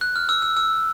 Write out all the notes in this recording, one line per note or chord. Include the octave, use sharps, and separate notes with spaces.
F#6
F6
E6
E6
E6